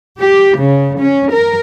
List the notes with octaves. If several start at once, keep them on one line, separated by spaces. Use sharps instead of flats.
G4
C#3
C#4
A#4